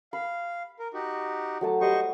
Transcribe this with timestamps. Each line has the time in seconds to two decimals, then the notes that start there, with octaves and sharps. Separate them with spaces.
0.13 F5 B5
0.79 A#4
0.94 D#4 F#4 G4
1.61 F#3 A3 A5
1.81 G3 C5 D#5 C#6